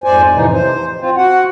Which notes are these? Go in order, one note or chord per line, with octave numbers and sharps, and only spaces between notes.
F2 G#2 C5 D5 G#5
F2 A2 C3 E3 F3 D#4
C5
C4 F4
F#4 F#5